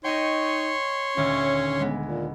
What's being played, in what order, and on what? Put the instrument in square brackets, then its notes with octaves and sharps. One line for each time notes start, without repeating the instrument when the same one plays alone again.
[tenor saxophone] D#4 [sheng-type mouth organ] C#5 C6 C#6 [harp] D#5 G5
[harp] D#1 D2 [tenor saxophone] C#4
[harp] G#3 B3
[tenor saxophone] A#2